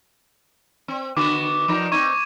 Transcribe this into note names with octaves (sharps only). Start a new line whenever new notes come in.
C4
D3 B3 F#4 D6
F3 D#4 A#4
C4 D#4 C#6 G#6